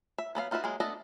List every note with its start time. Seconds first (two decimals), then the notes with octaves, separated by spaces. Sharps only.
0.18 E5
0.35 F#3 B3 A4 F5
0.51 D#4 F4 F#4 B4 E5
0.64 F#3 G#3 A#3 G#4
0.80 A3 B3 D4 A4 D#5